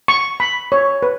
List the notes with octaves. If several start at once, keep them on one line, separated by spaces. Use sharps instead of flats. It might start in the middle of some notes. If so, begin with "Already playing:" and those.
C#6
B5
C#5
B4